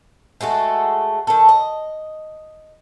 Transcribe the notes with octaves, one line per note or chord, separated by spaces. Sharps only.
G#3 A3 F#4 A4
D#3 A4
D#5